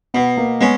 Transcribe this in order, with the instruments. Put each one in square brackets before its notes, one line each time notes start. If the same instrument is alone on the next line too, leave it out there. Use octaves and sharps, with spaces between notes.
[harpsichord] B2 [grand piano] B3
[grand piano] A#3
[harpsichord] G#3 C#4 [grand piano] B3